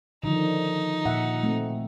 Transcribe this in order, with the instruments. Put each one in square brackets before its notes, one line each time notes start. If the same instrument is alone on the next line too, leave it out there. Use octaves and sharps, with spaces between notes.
[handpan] D3 D#3 F3 [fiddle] D#4
[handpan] A#2 E5 F#5
A3 C4